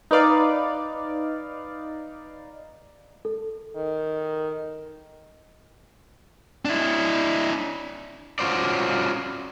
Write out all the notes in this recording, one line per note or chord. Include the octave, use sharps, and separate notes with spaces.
D#4 B4 D5 F5
A4
D#3
D4 E4
C#4 F4 F#4 C5 D5